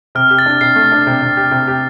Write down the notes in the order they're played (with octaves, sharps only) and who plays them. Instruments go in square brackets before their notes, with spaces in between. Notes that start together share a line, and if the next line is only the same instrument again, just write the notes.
[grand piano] C3 [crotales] F6
[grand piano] G4
[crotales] A6
[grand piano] D4
[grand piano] C3 [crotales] C7
[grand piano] A3
D4
C3
C3
G4
C3
G4